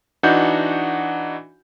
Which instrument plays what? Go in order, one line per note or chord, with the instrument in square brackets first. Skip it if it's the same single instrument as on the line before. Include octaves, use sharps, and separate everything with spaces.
[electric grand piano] E3 D4 D#4 F#4 F#5 G6